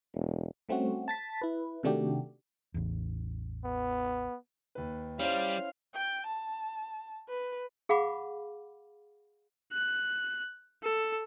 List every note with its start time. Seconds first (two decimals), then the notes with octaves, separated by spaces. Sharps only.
0.15 E1
0.69 G3 A3 C4 C#4 F#4
1.08 A5 A6 B6
1.42 E4 B4
1.83 C3 D#3 A3 D4 F#4 G4
2.74 A1 E2
3.64 B3
4.75 D#2 B4
5.20 G3 C#4 E4 C5 F5
5.95 G5
6.26 A5
7.29 B4
7.89 G#4 F5 F#5 B5 D6
9.73 F#6
10.84 A4